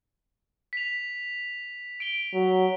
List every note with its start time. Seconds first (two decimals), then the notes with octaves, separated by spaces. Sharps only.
0.73 B6 F7
2.00 D7 G7
2.34 F#3